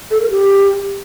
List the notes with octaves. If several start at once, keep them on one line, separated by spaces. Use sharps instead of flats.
A4
A#4
G4